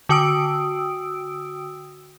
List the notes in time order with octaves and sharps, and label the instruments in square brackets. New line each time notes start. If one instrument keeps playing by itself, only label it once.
[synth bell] D3 F#4 G5 D#6 E6 D7